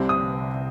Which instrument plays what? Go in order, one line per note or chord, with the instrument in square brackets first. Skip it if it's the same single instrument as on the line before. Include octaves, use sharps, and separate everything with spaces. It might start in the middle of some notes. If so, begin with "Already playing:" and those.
Already playing: [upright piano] C2 C3 G3 C4
D#6